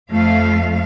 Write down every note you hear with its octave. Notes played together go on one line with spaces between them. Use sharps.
F2 A3 F5